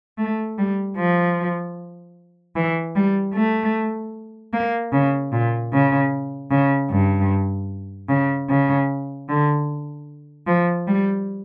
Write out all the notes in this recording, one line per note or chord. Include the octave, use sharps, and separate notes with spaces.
A3
G3
F3
E3
G3
A3
A#3
C#3
A#2
C#3
C#3
G2
C#3
C#3
D3
F3
G3